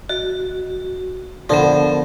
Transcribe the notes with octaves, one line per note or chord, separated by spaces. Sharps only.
F#4 D#5
D3 F3 B3 A4 A#4 D5 F#5 A5